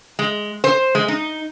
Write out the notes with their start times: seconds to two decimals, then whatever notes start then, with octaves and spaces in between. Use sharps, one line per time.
0.19 G#3
0.64 C5
0.95 G#3
1.08 D#4